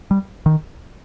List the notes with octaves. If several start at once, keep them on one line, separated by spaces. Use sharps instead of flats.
G3
D#3